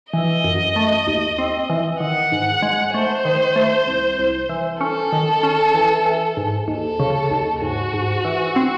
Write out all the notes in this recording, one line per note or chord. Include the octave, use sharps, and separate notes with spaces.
E3 D#5
F#2
A3
D#2
C4
E3
D#3 F#5
G#2
G#3
A3 C5
D#3
A3
C2
C2
E3
C#4 A4
D#3
C#4
E3
E3
G#2
D#2 A4
C#3
D#2
G#2 F#4
G#2
E3
C4